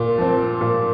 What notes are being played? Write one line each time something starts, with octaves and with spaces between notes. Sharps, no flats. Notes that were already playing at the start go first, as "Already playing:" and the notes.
Already playing: A#2
F3 C4
A#2